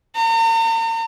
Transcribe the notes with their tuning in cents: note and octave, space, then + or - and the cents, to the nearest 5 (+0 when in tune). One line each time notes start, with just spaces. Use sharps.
A#5 -45